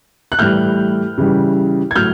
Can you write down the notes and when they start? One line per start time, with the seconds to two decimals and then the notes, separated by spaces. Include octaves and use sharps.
0.32 F#6
0.39 A2 E3 G3 F6 G6
1.18 C#3 E3 G3
1.91 G#6
1.96 A2 F#3 F6 G6